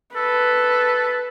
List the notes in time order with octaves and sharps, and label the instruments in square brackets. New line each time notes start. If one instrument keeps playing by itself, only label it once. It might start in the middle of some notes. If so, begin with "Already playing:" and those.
[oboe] A4 [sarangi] B4